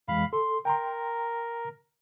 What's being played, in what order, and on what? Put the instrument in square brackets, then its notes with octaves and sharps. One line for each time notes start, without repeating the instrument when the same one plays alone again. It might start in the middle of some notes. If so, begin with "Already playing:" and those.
[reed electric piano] F2 E3 G#3 [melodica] F5 B5
[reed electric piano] A4 [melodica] C6
[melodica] A#4 [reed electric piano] G5 A#5 C6